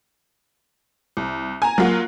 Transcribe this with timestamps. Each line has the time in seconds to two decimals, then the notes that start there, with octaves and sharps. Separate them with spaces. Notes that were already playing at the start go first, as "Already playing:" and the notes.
1.17 C2
1.62 G#5 A#5
1.78 F#3 A#3 F4 F#4